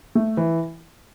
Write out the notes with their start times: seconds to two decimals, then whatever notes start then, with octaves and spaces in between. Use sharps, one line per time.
0.15 A3
0.37 E3